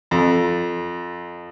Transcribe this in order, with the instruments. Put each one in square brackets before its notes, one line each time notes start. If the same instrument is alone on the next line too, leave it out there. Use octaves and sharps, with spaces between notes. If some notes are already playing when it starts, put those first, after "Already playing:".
[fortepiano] F2